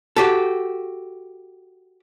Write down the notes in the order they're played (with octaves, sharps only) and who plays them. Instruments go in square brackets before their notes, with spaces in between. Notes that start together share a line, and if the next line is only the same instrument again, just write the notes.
[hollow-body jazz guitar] F#4 G4 A4